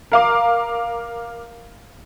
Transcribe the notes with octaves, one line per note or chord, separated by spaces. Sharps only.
A#4 F5 D6